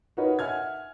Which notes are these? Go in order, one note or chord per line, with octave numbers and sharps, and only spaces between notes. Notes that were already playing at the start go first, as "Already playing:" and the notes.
D#4 F#4 A#4 B4 C#5 D#5
E5 F#5 G#5 F6 G#6